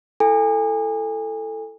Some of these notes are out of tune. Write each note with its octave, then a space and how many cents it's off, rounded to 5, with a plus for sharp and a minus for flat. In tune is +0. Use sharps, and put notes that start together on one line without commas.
E4 +25 A4 +0 G#5 -35